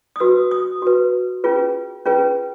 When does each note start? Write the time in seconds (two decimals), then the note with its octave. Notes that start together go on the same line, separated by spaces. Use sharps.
0.16 D#6
0.20 F#4 B4 E6
0.51 D#6
0.82 F#4 B4
1.44 C#4 F4 G#4 B4
2.05 C#4 F4 G#4 B4